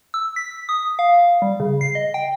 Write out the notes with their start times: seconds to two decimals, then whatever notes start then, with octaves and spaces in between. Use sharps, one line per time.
0.14 E6
0.36 B6
0.69 D#6
0.99 F5
1.42 G3
1.60 C#3
1.81 C7
1.95 D#5
2.14 G5